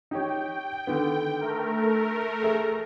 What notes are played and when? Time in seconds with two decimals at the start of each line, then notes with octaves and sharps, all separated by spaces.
0.11 D#4 G4 C#5 G5
0.87 D3 D#3 B3 A4
1.41 A3 A#4
1.74 A4
2.43 G#4 E5